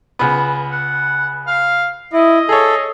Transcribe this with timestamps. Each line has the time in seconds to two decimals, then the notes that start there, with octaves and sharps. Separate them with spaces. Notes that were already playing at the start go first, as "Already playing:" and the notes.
0.19 C#2 B3
0.71 F#5
1.47 F5
2.13 E4 D#5
2.49 G#4 A4 C#5